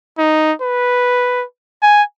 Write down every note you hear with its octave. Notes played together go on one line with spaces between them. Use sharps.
D#4
B4
G#5